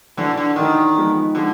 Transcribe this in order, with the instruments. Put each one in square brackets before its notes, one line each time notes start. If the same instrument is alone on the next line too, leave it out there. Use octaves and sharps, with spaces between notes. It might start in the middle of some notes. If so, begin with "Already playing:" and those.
[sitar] D3 [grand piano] E3 A3 D4 F#4
[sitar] D3
[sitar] D#3 [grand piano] E3 A3 D4 F#4
[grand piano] F3 G#3 B3
[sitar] D3 [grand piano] F3 G#3